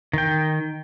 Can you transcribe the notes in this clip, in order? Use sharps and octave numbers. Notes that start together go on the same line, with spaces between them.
D#3 G5